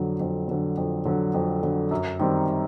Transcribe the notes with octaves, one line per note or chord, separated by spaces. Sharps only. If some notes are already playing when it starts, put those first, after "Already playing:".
Already playing: F2 D3 F#3
F2
D3 F#3
F2
D3 F#3
F2
D3 F#3
F#2
D#3 G3 C4